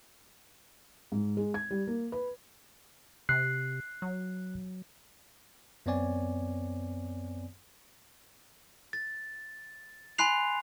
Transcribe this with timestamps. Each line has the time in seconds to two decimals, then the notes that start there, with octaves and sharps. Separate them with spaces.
1.12 G#2
1.37 G#3
1.54 G#6
1.71 G3
1.87 A#3
2.12 B4
3.29 C3 F#6 C7
4.02 F#3
5.86 F#2 B3 C4 C#5 D5 G#5
8.93 A6
10.18 G#5 B5 C6 F#6 C7 F7